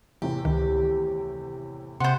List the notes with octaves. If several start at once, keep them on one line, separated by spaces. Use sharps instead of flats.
E2 A2 C3 G4
C#2 D#3
C3 C5 F#5 C6